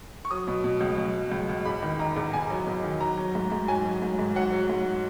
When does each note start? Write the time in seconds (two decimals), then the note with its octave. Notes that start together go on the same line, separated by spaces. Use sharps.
0.25 C#6
0.31 F#3 D#6
0.48 B2
0.64 B2
0.81 C#2
0.98 C#2
1.15 F#3
1.32 C#2
1.49 C#2
1.65 E2 B5
1.83 D#3
1.99 D#3 A#5
2.16 E2
2.33 E2 G#5
2.50 F#3
2.67 E2
2.84 D#3
3.01 F#3 A#5
3.17 F#3
3.35 G#2
3.52 G#2
3.68 F#3 G#5
3.85 F#3
4.02 G#2
4.19 G#2
4.35 F#3 F#5
4.52 F#3
4.69 G#2